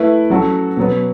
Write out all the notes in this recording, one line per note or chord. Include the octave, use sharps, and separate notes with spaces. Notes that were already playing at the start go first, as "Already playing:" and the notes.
Already playing: A3 E4 B4
F#3 C#4 F#4 A4
B2 F#3 B3